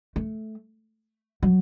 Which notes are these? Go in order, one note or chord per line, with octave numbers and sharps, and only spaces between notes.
A3
F#3